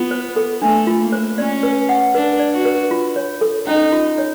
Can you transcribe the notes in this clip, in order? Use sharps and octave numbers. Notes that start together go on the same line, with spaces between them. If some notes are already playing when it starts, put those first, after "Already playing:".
Already playing: B3 F4
C5
A4
A3 D4
F4
A#3
C5
C#4 D5
B4
F#5
D4 B4
D5
F#4
B4
F4
C#5
A4
C#4 D#4
F4
C#5